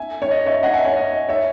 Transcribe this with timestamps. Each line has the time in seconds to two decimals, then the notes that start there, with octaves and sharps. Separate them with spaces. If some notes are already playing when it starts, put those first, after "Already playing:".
Already playing: E5 G#5
0.22 C#5
0.31 D#5
0.46 C#5 E5
0.63 D#5 F#5
0.74 E5 G#5
0.85 C#5
0.97 D#5
1.29 C#5 E5